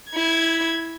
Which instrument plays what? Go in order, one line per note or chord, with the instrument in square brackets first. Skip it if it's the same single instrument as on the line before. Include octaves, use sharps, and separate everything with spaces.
[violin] E4 G#6